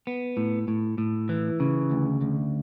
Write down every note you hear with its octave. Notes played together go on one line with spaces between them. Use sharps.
B3
A2
A2
A2
E3
C#3
D2
D2